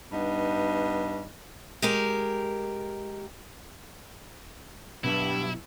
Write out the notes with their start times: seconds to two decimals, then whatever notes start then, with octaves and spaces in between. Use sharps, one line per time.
0.10 G2 B3 D#4
1.82 G#3 G4 A#4
5.04 G2 B2 F#3 E4 E5